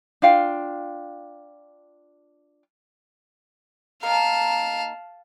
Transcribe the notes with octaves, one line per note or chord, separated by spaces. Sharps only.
D4 F4 F5 G5
A#3 D#4 A#4 F5 A5